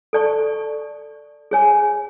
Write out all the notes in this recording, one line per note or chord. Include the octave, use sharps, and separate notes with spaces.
A4 D5 A5 C#6
G#4 C#5 G#5